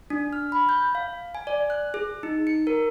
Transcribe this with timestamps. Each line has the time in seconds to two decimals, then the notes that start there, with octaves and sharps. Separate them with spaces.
0.10 D4
0.33 F6
0.52 B5
0.69 G6
0.95 F5
1.35 G#5
1.47 D5
1.70 F#6
1.94 G#4
2.23 D#4
2.47 C#7
2.67 A#4